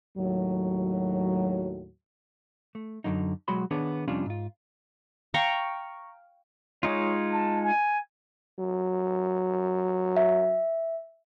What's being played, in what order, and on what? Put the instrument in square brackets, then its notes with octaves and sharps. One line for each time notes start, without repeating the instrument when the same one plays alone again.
[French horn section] D#2 A2 F#3
[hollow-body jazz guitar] A3
F#2 A2 D3 F#3 D#4
B1 F#3 G#3 F#4 B5 C6
D#3 B3 D4 G#4 C#5
F2 C3 G3 C#4 D4 F4
G#2 F4
[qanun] F5 G5 A#5 C#6
[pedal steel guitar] G#3 D#4 F4 [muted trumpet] C#5
[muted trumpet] A5
G#5
[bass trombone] F#3
[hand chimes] E5